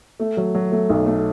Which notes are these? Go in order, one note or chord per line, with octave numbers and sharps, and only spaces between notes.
A3
F#3
F#3
A3
B1
A3